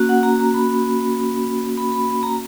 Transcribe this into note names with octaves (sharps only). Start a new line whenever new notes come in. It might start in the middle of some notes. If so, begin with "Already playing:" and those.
Already playing: A#3 C#4 F#4
F#5
A#5
A#5
B5
B5
B5
B5
A#5